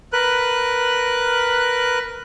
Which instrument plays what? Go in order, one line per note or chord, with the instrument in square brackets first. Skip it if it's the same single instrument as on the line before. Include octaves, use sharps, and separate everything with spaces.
[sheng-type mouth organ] A#4 B4 F#6